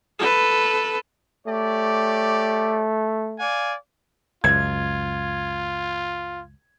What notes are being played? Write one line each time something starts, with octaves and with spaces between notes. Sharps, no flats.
A4 B4
A3 G4 C#5 D5
D5 F5 G#5
C#2 F#2 F4 G#6